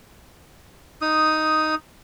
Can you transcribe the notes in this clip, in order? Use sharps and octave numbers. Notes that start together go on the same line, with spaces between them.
D#4 D#6